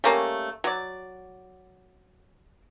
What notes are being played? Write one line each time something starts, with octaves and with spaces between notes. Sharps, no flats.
G3 A3 A#3 C#4
F#3 D5